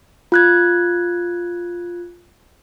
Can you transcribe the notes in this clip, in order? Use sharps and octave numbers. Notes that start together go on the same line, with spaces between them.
F4 F#6 G#6